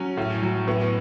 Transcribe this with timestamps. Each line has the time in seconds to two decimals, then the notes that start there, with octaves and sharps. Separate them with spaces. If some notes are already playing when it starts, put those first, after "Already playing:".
Already playing: F#3 C#4
0.17 A2
0.43 F#3
0.67 A2 B3